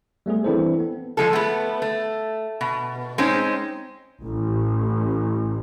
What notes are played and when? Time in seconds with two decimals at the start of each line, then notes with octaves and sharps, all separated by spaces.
0.26 G3 A3 B3 G#4
0.44 E3 C4 D4 E4 A4 C5
0.80 B3
1.17 F3 G#3 A4
1.33 A3 B3
1.82 A3
2.61 B2
3.18 G#3 C4 C#4 D#4
4.22 A1